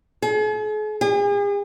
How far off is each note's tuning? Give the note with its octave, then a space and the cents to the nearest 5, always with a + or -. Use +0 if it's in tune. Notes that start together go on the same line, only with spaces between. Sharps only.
G#4 +45
G#4 -40